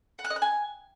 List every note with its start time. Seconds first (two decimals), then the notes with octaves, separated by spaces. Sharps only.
0.19 F#5
0.25 F#6
0.30 D#5
0.36 F#6
0.42 G#5